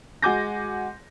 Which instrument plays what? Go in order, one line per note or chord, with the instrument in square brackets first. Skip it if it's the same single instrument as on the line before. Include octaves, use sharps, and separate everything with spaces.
[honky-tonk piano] G#3 F#4 G#5 D6 G6 A#6